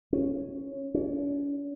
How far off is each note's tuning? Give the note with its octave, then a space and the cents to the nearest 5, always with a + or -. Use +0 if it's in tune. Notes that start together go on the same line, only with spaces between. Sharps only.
C#4 -5
C#4 +45